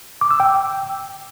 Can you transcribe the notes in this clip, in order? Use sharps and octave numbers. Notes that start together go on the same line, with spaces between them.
D6
E6
G5